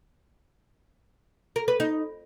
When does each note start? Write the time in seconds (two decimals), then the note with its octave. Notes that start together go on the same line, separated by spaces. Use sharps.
1.56 A#4
1.68 B4
1.80 D#4